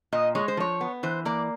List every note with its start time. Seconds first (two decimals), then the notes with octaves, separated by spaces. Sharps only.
0.12 A#2 D#5
0.35 G#3 C#5
0.48 C5
0.57 F3 C#5
0.81 B3
1.03 E3 C5
1.25 A#3 D5